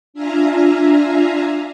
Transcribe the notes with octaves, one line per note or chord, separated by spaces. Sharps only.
D4 F4 E5 F5 G#5 A#5